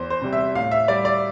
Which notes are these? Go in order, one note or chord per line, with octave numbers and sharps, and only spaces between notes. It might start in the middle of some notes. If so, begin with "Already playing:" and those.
Already playing: E2 C5
C5
C3 G3
E5
A2 F5
E5
G3 D5
D5